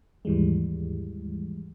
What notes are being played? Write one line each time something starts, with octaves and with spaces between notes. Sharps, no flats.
D#2 G#2 E3 G3 G#3